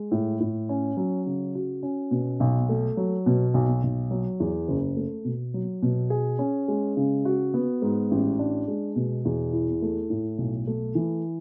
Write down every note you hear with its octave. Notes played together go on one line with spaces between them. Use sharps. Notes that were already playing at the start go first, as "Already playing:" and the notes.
Already playing: G#3
A2
A2
C#4
F#3
C#3
F#4
C#4
B2
B1
A3
F#3
B2
B1
B1
F#3
E2
F#1
A3
B2
F#3
B2
G#4
C#4
G#3
C#3
F#4
B3
G#2
A1
D4
G#3
B2
E2
E4
A3
A2
B1
A3
E3